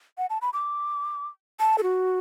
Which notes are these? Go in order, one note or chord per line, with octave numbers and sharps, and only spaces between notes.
F#5
A5
B5
D6
A5
A4
F#4